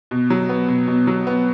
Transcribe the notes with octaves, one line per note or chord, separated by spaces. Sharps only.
B2
F#3
B3
B2
B2
F#3
B3